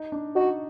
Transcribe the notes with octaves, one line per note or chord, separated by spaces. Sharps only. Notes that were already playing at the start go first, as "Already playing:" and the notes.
Already playing: D#4
D4
D#4 F#4